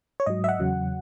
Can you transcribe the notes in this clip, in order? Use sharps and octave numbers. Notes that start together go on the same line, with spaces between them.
C#5
G#2 F#3 D#5
E5
F#5
E2 C#3 F#3